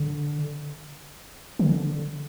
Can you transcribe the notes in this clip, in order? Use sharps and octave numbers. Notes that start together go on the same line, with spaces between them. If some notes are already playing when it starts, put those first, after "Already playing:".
Already playing: D3
D#3
D3